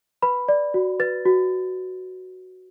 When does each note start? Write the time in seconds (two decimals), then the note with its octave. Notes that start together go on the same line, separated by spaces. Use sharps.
0.22 B4 B5
0.49 D5
0.74 F#4
1.00 B4 A6
1.26 F#4